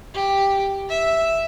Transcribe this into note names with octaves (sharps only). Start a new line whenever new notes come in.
G4
E5